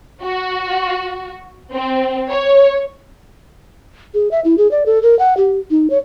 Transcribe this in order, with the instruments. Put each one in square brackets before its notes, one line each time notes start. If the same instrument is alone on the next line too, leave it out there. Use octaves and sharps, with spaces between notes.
[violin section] F#4
C4
C#5
[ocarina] G#4
E5
E4
G#4
D5
A4
A#4
F#5
G4
D#4
C#5